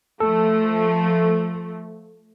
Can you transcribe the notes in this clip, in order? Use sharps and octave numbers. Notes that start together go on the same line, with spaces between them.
F3 A3 A4